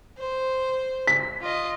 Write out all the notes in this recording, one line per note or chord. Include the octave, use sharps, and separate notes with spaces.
C5
B6
F4 D#5